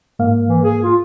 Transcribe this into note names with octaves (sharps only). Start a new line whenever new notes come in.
G#2 A#3 F5
E3
G#4
F4